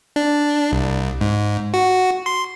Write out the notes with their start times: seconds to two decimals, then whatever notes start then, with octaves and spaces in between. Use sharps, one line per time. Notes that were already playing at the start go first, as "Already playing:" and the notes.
0.16 D4
0.72 C2
1.21 G#2
1.74 F#4
2.26 C6